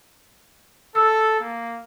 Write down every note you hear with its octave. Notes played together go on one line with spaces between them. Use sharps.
A4 E6
A#3